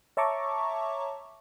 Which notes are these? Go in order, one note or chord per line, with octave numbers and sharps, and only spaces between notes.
C#5 E5 A5 A#5 C#6 D6